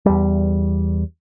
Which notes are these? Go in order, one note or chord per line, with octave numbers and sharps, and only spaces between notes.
E2 G3